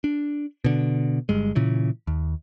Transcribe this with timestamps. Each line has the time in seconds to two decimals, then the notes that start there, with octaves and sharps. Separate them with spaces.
0.04 D4
0.64 B2 D3
1.29 G1 G2 G#3
1.55 A#2 C#3 E3
2.07 D#2